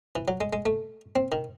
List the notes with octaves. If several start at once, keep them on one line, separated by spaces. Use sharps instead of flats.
E3
F#3
G#3
G#3
A3
C4
D#3